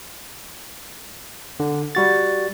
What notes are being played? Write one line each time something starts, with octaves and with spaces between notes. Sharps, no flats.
D3
G3 F#4 A6